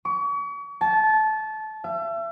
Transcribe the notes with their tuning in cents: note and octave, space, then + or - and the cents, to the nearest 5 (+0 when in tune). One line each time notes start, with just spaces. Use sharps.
C#6 +40
A5 -20
E5 +35